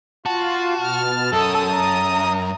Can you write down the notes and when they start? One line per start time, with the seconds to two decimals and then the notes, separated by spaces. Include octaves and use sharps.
0.26 F4 F#4 A5
0.81 B2 F6
1.33 F#2 A4 D#6
1.73 A#5